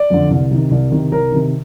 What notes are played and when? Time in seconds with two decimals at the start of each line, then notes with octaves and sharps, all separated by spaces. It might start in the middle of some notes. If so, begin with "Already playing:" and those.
Already playing: D5
0.10 F2 D3
0.31 C2
0.51 C3 D#3
0.71 C2
0.91 C3 D#3
1.12 C2 A#4
1.32 C3 D#3